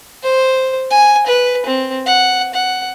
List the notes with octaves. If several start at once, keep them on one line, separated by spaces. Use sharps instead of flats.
C5
G#5
B4
C4
F#5
F#5